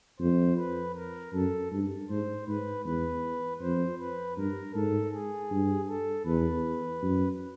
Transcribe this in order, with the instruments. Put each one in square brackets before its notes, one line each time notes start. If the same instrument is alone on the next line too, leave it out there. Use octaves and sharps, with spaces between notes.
[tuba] F2 [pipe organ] C5
[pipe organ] B4
A#4
[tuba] F#2 [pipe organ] A4
[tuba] G2
[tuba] G#2 [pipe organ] C5
[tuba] G#2 [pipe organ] B4
[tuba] E2 [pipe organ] B4
[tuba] F2 [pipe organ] C5
[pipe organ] B4
[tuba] G2 [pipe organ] A#4
[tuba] G#2 [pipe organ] A4
[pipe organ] G#4
[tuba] G2
[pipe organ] A4
[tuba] E2 [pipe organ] B4
[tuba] F#2